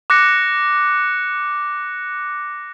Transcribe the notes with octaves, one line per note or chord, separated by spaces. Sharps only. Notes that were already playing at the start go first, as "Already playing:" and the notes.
D6 F#6 A#6 C#7